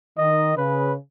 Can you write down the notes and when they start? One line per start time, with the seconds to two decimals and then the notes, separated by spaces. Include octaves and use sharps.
0.18 D#3 D#5
0.57 C#3 B4